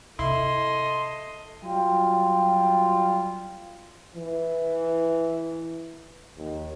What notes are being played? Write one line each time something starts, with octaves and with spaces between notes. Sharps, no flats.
C3 E4 A4 D#5 C6
F#3 G3 F4 G5
E3
D#2